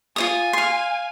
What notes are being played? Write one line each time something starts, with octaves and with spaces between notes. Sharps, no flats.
F4 C#5 G#5 D#6
F5 C6